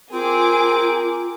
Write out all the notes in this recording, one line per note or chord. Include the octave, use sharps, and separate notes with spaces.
C4 F4 G#4 A#4 D6